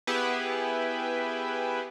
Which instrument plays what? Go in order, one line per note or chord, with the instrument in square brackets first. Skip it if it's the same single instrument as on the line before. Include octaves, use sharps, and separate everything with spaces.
[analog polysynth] B3 E4 G4 G#4 B4